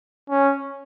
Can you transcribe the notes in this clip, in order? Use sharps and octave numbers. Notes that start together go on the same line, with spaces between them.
C#4